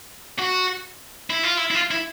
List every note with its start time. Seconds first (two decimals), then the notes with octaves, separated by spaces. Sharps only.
0.39 F#4
1.30 E4
1.43 F4
1.57 E4
1.71 E4
1.75 F4
1.91 E4